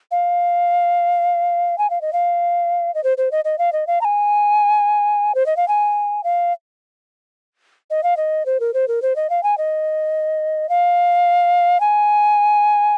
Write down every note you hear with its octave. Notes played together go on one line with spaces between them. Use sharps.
F5
G#5
F5
D#5
F5
D#5
C5
C5
D#5
D#5
F5
D#5
F5
A#5
G#5
C5
D#5
F5
G#5
F5
D#5
F5
D#5
C5
A#4
C5
A#4
C5
D#5
F5
G#5
D#5
F5
G#5